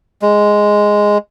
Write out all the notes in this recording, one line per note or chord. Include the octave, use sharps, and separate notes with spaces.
G#3